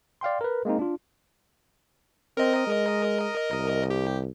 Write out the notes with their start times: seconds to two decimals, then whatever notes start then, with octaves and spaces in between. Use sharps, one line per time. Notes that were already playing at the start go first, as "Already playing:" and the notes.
0.21 D5 F5 G5 C6
0.41 A#4 B4
0.65 G#3 A#3 C4 D#4
0.79 D4 F4
2.37 C4 A#4 D#5
2.67 G#3
3.51 C2
3.90 G4